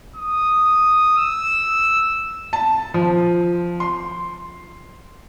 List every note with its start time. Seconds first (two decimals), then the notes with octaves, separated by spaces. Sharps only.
0.16 D#6
1.18 E6
2.53 A5
2.94 F3
3.80 C6